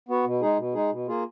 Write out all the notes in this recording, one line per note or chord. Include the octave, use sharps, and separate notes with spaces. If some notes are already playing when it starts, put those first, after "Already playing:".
B3 F#4
B2
G#3 D#4 G#4
B2
G#3 D#4 G#4
B2
A#3 F4 G#4